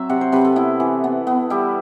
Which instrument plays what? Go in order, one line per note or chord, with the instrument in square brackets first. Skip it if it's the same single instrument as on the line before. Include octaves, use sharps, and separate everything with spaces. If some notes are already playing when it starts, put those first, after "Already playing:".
Already playing: [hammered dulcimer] F#3 C4 E5
C3 F#5
C5
C3 B4
A4
B3 E4
E3
B3
B3
G3 E4